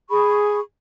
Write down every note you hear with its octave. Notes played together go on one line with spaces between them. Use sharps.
G#4 B5 C#6